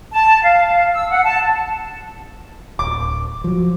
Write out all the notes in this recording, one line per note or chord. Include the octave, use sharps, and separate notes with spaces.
A5
F5
E6
F#5
A5
D1 D6
F3 F#3